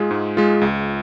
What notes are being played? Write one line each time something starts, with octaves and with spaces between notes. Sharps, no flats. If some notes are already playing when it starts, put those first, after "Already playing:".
Already playing: G#2 G#3 F4 G#4
G#2
G#3 F4 G#4
C#2